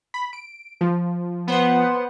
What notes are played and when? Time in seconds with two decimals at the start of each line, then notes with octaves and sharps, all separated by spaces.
0.14 B5
0.33 D7
0.81 F3
1.47 B3 C5 F#5